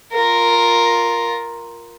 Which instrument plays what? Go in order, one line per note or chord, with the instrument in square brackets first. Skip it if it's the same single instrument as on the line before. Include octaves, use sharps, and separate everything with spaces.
[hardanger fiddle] F4 A#4